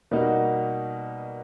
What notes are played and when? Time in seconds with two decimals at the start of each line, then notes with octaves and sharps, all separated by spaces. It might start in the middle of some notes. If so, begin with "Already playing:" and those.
0.11 B2 G3 A#3 D#4 F#4